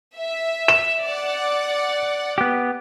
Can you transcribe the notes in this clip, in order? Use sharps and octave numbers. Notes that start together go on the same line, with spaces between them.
E5
E7
D5 F#5
B3 G4